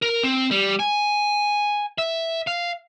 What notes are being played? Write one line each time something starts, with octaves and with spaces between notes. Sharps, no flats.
A#4
C4
G3
G#5
E5
F5